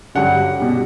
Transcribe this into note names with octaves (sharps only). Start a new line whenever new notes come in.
G2 D3 F#3 F#5
B2 G3